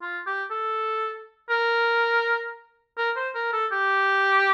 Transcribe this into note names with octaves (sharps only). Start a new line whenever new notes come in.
F4
G4
A4
A#4
A#4
C5
A#4
A4
G4